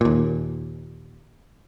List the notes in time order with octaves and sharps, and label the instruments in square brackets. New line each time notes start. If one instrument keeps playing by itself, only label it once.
[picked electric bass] D#2 A#2